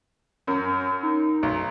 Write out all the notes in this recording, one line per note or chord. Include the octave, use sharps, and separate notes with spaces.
F#2 A#4
D#4
B1